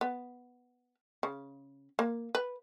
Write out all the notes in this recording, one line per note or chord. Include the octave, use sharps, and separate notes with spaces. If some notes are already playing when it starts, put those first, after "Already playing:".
B3
C#3
A#3
B4